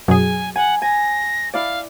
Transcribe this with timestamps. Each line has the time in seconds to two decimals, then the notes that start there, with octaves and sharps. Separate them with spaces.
0.08 F#2 B2 F#3 G#4 G#5
0.56 F#5 G#5
0.82 G#5 A#6
1.54 E4 D5 F5